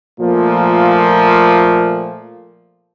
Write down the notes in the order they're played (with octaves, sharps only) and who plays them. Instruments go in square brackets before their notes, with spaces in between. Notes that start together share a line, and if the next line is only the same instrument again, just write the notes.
[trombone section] A#2 F3 A3 A#3